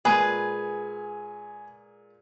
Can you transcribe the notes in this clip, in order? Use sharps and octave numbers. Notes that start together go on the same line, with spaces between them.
A#2 G#3 G#4 B4 G#5